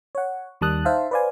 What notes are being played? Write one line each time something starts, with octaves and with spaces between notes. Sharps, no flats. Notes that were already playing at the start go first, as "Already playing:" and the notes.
C#5 F#5
D#2 D#3 G3 A5 D#6 F#6
D#4 C5 E5 F5 A5
B4 C5 D5 F5 G#5